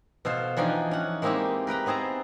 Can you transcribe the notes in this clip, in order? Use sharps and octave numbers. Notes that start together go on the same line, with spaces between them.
B2 A4 C5 F5
E3 F3 D4 D#4 G5 G#5
C#4 F#5
G#3 A#3 C4 D#4 E4 G4
A#4 B4 G5 A#5
B3 C4 G#4 A5 A#5